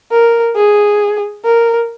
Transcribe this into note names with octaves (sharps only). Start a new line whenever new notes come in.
A#4
G#4
A#4